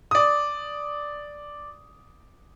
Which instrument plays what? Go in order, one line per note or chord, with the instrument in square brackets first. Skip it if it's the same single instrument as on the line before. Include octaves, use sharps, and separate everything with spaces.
[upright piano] D5 D#6